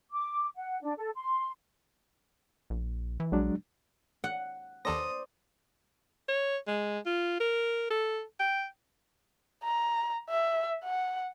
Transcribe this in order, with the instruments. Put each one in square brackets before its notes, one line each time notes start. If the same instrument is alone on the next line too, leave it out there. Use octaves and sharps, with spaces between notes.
[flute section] D6
F#5
D4
A4
C6
[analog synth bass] A#1
E3
[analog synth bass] A#1 [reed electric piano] F#3 G#3 D4
[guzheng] F#5
[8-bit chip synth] D#2 A4 A#6 [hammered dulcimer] C5 D5 A#5 [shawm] D#6
[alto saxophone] C#5
G#3
F4
A#4
A4
G5
[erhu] A#5
E5
F#5